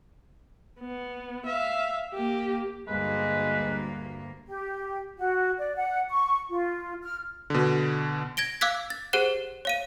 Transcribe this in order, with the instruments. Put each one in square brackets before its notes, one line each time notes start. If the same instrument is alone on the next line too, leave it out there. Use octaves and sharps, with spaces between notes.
[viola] B3
E5 F5
A#3 G4
[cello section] D2 G2 A#3 [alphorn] G#3 [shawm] B4
[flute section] G4
F#4
D5
F#5
C#6
F4
F6
[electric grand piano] B2 D3
[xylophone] G#6 A#6 D7 G7
F5 D6 E6 F#6 G#6 B6
A6
G4 G#4 C5 F#5 F#6 E7
C#5 F5 D#7